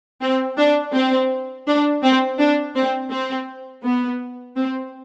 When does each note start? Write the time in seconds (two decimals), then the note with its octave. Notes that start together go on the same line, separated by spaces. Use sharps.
0.21 C4
0.57 D4
0.93 C4
1.67 D4
2.03 C4
2.39 D4
2.75 C4
3.11 C4
3.84 B3
4.56 C4